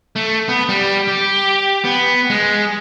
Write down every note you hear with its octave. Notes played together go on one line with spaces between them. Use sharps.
A3
B3
G3
G4
B3
G#3